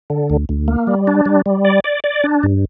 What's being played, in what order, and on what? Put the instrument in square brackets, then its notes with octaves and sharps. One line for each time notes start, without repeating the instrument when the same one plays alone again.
[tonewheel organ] D3
D2
D2
A#3
G3
D4
G3
G3
D5
D5
D5
D4
G2